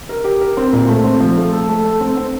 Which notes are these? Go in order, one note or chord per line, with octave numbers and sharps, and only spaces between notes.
A#4
G4
A#4
C4
A#2
A3
C4
F3
A3
A4
A3
A4
C4
C4